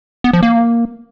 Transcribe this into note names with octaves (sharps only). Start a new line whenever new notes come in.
B3
F3
A#3